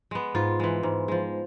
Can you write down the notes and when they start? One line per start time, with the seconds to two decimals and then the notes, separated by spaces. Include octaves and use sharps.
0.11 G#3 B3
0.35 G#2 F4
0.60 E3 G#3
0.83 G#2
1.08 F3 G#3